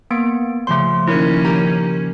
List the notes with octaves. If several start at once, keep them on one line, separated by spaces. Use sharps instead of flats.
A#3 B3 D7
C#3 F3 A3 C5 C6
D#3 A#3 C#4 E4 A#4
G4 A#4 A#5 F6